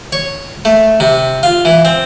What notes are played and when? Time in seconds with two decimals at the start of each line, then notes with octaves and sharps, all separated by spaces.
0.13 C#5
0.65 A3
1.00 C3
1.43 F4
1.65 E3
1.85 C4